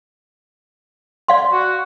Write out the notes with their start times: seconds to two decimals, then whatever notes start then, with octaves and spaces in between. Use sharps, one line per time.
1.28 D5 F5 C6
1.52 F#4